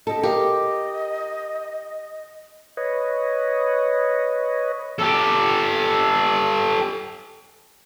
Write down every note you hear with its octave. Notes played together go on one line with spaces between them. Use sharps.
G4 A4 D#5
G4 A#4 F5
B4 C#5 D#5
G4 A4